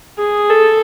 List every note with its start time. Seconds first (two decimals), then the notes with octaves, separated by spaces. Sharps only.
0.18 G#4
0.50 A4